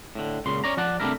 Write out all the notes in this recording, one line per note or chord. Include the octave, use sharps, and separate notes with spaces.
A2 D3
C#2 A#2 C#3 C6
C#4 C#5 D5 A#5
F3 D5 F#5 A5
C3 G3 A3 D4 E4 A#4